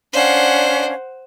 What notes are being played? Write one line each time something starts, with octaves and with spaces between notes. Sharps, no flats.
C#4 D4 C5 F5 F#5